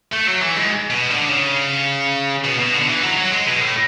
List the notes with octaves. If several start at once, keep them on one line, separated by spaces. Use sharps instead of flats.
A3
F#3
E3
G#2
B2
D3
C#3
B2
B2
D3
E3
F#3
F#3
G#3
B2
A2